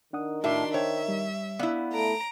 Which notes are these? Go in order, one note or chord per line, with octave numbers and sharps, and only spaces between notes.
D#3 D4 F#5 D#6
A2 D4 F#4 A#4 E5 C6 D6
C5 C#5 E5 G5
G3
B3 E4 D5 F5 F#5
A3 A#5 D7